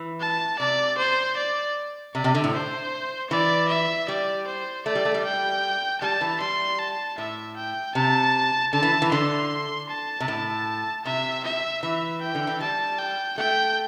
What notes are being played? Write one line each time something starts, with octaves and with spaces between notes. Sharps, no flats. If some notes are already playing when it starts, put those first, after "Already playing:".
Already playing: E3
A5
C3 D5
C5
D5
C3 D5
C3
D3
A2
C5
E3 D5
E5
G3 D5
C5
A3 D5
G3
A3
G3
G5
G3 A5
E3
G3 C6
A5
A2 E5
G5
C3 A5
D3 A5
E3
E3
D3 C6
A5
C3
A2
C3 E5
E5
E3 E5
G5
D3
E3
G3 A5
G5
A3 G5